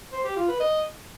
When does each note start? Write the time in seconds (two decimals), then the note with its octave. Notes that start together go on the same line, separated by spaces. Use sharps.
0.12 C5
0.24 G4
0.36 F4
0.48 B4
0.60 D#5